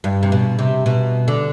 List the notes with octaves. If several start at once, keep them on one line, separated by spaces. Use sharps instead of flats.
G2
C3
B2
C3
B2
D3